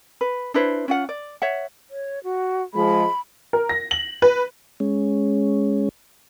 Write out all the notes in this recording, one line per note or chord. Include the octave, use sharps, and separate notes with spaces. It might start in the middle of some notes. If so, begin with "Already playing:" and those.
B4
D4 E4 B4 C5
C#4 F4 F#5
D5
C#5 E5 F#5
C#5
F#4
F3 G#3 B5
A#4
A#6
F#7
B4
G#3 C#4